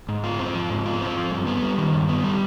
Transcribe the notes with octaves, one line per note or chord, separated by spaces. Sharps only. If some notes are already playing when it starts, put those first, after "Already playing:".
G#2
F4
C4
F3
G#2
F4
C4
F3
G2
B3
G3
D#3
G2
B3
G3